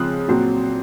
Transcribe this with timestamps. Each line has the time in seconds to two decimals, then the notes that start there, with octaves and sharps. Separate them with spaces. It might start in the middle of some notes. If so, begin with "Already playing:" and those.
Already playing: C#3 F3 G#3 C4 D#6 F#6
0.28 A#2 F#3 C4